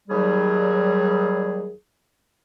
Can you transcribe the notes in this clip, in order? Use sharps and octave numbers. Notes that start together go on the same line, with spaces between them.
D#2 F#3 G3 G#4